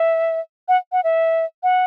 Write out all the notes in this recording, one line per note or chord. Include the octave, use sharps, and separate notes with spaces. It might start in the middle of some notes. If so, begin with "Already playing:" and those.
Already playing: E5
F#5
F#5
E5
F#5